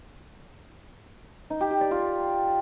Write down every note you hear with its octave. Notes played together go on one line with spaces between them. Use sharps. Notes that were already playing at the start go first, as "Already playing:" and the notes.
D#4
G4
G4
D5
F4